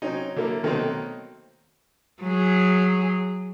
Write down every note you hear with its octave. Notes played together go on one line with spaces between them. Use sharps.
F#3 C4 C#4 D#4
D3 F#3 A#3 E4
B2 D#3 F#3 A3 A#3 C4
F#3 G#4